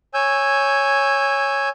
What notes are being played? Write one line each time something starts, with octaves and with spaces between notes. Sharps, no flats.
C#5 G#5 E6 G6